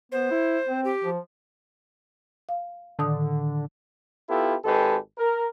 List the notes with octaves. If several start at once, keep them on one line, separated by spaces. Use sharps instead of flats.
B3 C5
E4
C4
G4
F3
F5
A2 D3 D#3 D#6
B3 E4 F4 G4 A4
G#1 G#3 G4 A4 B4
A#4